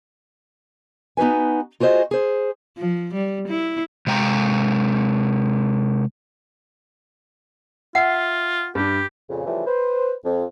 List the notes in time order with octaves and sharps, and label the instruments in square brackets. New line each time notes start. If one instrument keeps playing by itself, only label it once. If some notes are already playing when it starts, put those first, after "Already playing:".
[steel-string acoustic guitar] B3 D#4 F#4 B4 G#5
F4 F#4 G#4 C5 D#5
G#4 C5
[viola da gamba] F3
G3
E4
[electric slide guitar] C3 G#3 G5 A#5
[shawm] F4 [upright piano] E5 [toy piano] F#5
[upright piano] G2 D4 [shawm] G4
[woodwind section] F2 A#2 C#3
C#3 E3 F3 G3 A3
B4 C5
F2